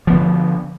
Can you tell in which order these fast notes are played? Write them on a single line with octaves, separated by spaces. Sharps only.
F3 B3 D3